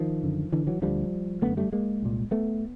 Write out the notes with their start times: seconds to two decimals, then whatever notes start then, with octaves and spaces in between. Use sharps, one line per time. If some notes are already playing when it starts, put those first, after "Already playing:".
Already playing: D#3 F3
0.23 F#2 D3
0.52 D3 E3
0.67 E3 F#3
0.82 D2 D3 F3 G3
1.42 F#2 D3 A3 B3
1.57 G3 A3
1.72 G#3 A#3
2.02 C2 A#2
2.31 A3 B3